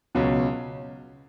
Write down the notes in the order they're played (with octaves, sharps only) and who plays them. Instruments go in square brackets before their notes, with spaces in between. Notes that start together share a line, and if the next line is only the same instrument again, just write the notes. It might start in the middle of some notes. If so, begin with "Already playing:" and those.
[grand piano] C#2 B2 F#3 C#4